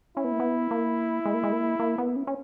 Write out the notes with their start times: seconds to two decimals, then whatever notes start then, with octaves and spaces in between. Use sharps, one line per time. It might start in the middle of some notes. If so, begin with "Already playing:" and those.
0.17 C#4 E4
0.24 B3
0.32 A#3
0.40 B3
0.71 A#3
1.26 G#3
1.34 A#3
1.44 G#3
1.53 A#3
1.79 A#3
1.98 B3
2.16 C#4
2.27 C#4